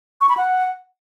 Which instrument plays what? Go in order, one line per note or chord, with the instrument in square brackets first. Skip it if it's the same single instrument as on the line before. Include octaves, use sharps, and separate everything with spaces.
[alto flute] C#6
B5
F#5